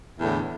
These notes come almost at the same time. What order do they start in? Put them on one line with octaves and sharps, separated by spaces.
E2 A2 D3